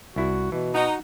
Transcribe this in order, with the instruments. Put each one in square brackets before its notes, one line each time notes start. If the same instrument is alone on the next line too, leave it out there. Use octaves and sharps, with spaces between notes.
[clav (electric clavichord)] C2 E4 [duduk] F#4
[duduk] B2 [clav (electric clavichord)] E3
[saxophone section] D#4 [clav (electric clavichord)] F#4 F#5